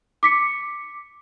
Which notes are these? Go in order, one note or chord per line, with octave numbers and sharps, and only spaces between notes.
D6 B6 C#7